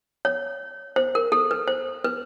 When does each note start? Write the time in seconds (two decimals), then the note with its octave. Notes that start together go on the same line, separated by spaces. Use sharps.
0.25 C#5
0.96 C5
1.15 A#4
1.32 A4
1.51 B4
1.68 C5
2.04 B4